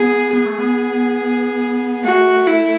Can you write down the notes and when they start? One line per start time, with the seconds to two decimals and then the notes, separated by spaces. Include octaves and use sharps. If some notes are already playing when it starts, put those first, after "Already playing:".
Already playing: B3 G#4
0.33 B3 G#4
0.46 A3
0.59 B3
2.04 A3 F#4
2.47 E4